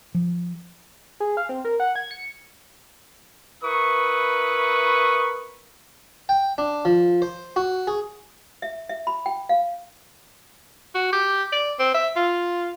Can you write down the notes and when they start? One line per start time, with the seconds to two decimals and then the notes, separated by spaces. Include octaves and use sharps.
0.15 F3
1.20 G#4
1.37 F5
1.49 C4
1.65 A#4
1.80 F#5
1.96 G#6
2.11 C#7
3.64 E4 A#4 B4 C#6 D#6
6.29 G5
6.58 D4
6.85 F3
7.22 C5
7.56 F#4
7.87 G#4
8.62 E5
8.89 E5
9.07 B5
9.26 G5
9.49 F5
10.95 F#4
11.12 G4
11.52 D5
11.79 C4
11.94 E5
12.16 F4